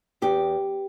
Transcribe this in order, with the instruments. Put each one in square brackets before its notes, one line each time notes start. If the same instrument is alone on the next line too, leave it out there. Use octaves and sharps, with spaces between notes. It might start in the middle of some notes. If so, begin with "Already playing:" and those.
[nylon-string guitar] E2 G4